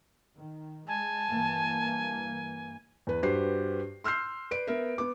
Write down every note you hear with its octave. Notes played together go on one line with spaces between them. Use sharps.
D#3
G#3 G#5 A5
G2 E3 A#3
E2 B4
G2 F#4 G4 B4 C5 C7
C6 E6 F6 G6 C7
B4 D5 D7
B3 A#4 E5
B3 D6